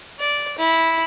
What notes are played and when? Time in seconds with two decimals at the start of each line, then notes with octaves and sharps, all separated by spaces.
0.19 D5
0.59 E4